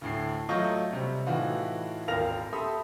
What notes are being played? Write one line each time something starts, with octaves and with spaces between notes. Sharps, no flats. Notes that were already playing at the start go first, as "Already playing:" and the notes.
D2 A2 C7
F#3 A3 F4 D#5 C#6 G6
C3 G3
A2 E3 D#4 F4 F#4
D#1 G#1 A#4 F5 A#6 F7
G4 A4 E5 B5 C6 D#6